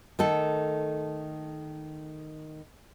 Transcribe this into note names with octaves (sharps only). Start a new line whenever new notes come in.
D#3 A3 A4